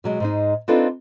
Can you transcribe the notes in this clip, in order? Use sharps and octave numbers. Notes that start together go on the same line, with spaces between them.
B2 F#3 G#3
G#2 G#3 D#4
C4 D4 D#4 F4 A4 B4